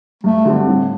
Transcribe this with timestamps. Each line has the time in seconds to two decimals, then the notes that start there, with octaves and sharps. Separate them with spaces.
0.23 G2 A3
0.45 D3 G3 C4
0.67 A2